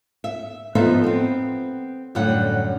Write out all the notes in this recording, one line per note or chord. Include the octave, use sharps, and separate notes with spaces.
E5
F3 B3 D#4 A4 C5 E5
B3 C4
F#2 A2 D3 G3 F#5 G5